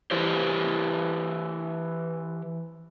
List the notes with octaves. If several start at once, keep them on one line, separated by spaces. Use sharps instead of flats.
E3 E4 G4 C5